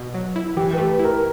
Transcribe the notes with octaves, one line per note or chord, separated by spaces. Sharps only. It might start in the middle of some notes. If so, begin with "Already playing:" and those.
Already playing: B2
F#3
E4
E3 G4
A3 B4
E4
A#4